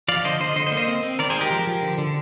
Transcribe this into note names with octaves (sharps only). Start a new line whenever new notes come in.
F3 D5 F5
D3 C5 D#5
D3 C5 D#5
D3 C5 D#5
C5 D#5
A#3
C5 D#5
C4
C4
D#3 A#4 D5
G#4 C5
G#3
G4 A#4
F3
F3
D3
D3